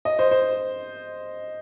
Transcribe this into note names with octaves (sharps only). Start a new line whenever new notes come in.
D#5
C5
C5